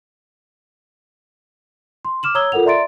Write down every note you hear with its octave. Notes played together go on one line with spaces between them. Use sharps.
C6
D6 F6 E7 F#7
C#5 A#5 D#6 E6 G#6 G7
F4 A4 A#4 F#5 F7
D5 E5 A#5 C6 A6 D7